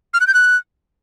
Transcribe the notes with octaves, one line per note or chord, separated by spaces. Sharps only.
F6
F#6
G6
F#6